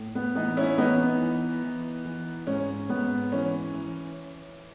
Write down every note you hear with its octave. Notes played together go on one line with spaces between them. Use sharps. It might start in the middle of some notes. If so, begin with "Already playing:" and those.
Already playing: A2
B3
E3 B3 D#4
C#4 E4
E3 B3 D#4
E3
E3
E3
G#2 C#4
G#2 B3
E3 C#4
E3